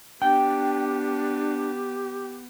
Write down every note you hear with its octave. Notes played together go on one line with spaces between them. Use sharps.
B3 D4 G4 G5